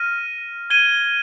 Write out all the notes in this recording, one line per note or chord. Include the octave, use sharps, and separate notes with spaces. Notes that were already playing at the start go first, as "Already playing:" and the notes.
Already playing: F6 A#6 D#7
G#6 D#7 G7